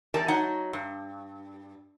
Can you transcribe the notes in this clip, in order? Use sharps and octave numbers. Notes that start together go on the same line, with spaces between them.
E2 G3 A#4 D5 A5
F#3 D#4 F#5
G2